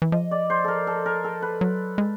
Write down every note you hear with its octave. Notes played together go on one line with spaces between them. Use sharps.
E3
F3 D#5
D5
C5
A4 A#4
A4
A#4
A4
B4
F#3
G#3